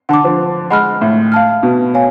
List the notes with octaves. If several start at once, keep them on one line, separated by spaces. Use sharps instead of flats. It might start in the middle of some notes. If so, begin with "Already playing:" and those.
D3 F#5 A5 D6
F3
G#3 F#5 B5 F6
A2
F5 A5 F6
B2
C#5 F5 G#5